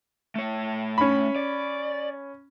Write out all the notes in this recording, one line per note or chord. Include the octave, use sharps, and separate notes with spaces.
A3 C#5
C#4 B5
D5